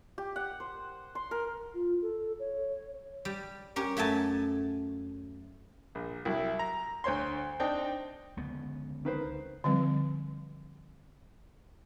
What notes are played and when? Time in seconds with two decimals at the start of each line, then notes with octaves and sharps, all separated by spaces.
0.18 G4
0.36 F#5
0.60 C5
1.15 C6
1.31 A#4
1.74 F4
2.02 A4
2.39 C#5
3.25 G3
3.76 C#4 G4 A#4
3.97 F#2 A3 G#5 A5
5.95 A#1
6.25 C2 F#3 E4
6.59 A#5
7.04 D2 C5 C#5 C6
7.60 C4 D4 D#4 G5
8.37 C#2 D3 B3
9.05 D#3 B4 C5
9.64 D3 F3 G3 C4 B4